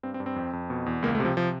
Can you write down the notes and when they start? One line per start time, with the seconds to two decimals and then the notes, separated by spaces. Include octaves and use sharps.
0.03 G2 C4
0.14 C4
0.20 G2
0.26 C4
0.36 F2
0.53 F2
0.70 B2
0.86 E2
1.02 C#2 A#3
1.15 A3
1.20 C3
1.25 F3
1.37 C3 F3